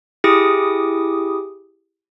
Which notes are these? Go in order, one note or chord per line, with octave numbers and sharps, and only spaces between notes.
E4 G4 G#4 D6 D#6